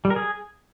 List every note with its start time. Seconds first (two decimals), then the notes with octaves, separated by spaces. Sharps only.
0.05 G3
0.10 A#4
0.16 G#4